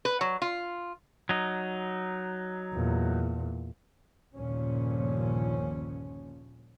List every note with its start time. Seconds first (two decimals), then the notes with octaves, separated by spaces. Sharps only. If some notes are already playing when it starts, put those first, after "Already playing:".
0.05 B4
0.21 F#3
0.42 F4
1.29 F#3 D#4
2.73 E2 A#2
4.34 G1 D#2 A#2 C#3 F3 C#4